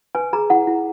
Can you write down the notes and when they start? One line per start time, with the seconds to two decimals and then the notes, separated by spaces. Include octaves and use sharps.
0.15 B4 G#5
0.33 G#4 A#5
0.50 E4 F#5
0.67 E4